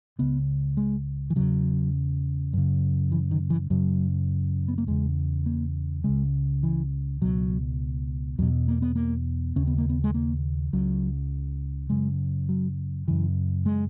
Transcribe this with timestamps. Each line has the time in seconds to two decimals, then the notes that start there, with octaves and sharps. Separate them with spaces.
0.19 C#2 C#3 B3
0.77 G#3
1.30 E3
1.36 E2 C#3 F#3
2.53 F#2 C#3
3.12 E3
3.31 D#3
3.50 E3
3.70 F#2 C#3 F#3
4.68 B3
4.78 A#3
4.87 E2 C#3 G#3
5.46 A#3
6.04 C#2 C#3 G#3
6.63 E3
7.21 C#2 B2 F#3
8.39 E2 B2 F#3
8.68 A#3
8.82 B3
8.96 A#3
9.56 D#2 C#3 C#4
9.67 B3
9.78 A#3
9.90 B3
10.04 G#3
10.14 A#3
10.73 C#2 C#3 F#3
11.90 F#2 C#3 G#3
12.49 F#3
13.08 F#2 C#3 E3
13.66 G#3